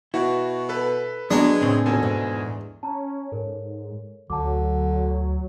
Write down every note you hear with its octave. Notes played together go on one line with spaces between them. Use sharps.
B2 E4 F#4
A4 B4
F#3 G#3 B3 D4
A2 C#3 C4
D#2 B2 A4 G#5
E2 G#2
C#4 A5 A#5
G#2 A4 A#4 C#5
D2 D3 F#3 A5 D6